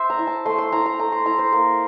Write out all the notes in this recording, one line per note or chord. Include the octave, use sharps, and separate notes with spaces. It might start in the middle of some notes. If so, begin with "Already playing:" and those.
Already playing: C5 E5
A#5
E4
A5
A3 C6
C6
E4 A#5
A#5
A3 A#5
C6
E4 A#5
C5
A#3 A#4